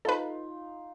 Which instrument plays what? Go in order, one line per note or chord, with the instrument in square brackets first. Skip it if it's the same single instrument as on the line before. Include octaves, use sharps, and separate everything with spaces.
[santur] D#4 F4 [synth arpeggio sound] A4 B4